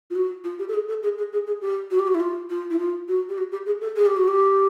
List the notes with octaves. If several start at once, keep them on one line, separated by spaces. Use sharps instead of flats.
F4
F#4
F4
G4
A4
G#4
A4
G#4
G#4
G#4
G#4
G4
F#4
G4
F#4
E4
F4
F4
E4
F4
F#4
G4
F#4
G4
G#4
A4
G#4
G4
F#4
G4